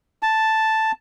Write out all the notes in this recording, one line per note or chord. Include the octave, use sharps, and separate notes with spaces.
A5